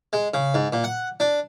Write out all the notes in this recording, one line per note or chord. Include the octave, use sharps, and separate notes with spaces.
G#3
C#3
G#2
A#2
F#5
D4